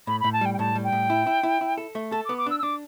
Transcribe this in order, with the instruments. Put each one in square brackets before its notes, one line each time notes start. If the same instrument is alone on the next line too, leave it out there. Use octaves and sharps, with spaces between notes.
[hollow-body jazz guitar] A2 [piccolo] B5
[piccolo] B5
[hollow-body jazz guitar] A2
[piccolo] A5
[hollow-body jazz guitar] G3 [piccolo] G5
[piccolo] G5
[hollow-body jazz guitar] A2 [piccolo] A5
[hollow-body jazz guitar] G3
[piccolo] G5
[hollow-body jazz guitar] A2
E4
E4
E4
E4
A4
A3
[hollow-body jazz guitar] A4 [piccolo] A5
[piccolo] D6
[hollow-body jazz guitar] B3
[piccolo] D6
[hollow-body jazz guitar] D4 [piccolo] E6
[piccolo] E6
[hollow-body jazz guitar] D4 [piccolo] D6